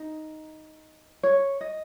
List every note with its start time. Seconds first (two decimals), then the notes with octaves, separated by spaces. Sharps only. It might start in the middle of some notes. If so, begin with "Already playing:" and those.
Already playing: D#4 A#5
1.23 C#5
1.61 D#5